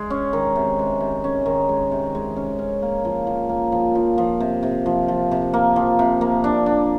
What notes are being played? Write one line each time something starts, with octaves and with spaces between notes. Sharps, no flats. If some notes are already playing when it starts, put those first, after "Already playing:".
Already playing: G#3
C#4
D#3
C3
G#3
C3
C#4
D#3
G#3
C3
G#3
C#4
C#4
A#3
F3
F3
A#3
F3
F3
F3
C3
C3
F3
F3
C3
A#3
F3
C3
A#3
D4
D4